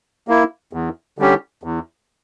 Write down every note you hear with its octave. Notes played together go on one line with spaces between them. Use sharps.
A#3 E4
E2
D3 G3 C#4 G4
E2